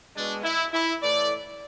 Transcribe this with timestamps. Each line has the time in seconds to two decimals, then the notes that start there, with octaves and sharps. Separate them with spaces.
0.15 B2 G#3 D4
0.44 E4
0.73 E4
1.01 A2 E3 A3 D5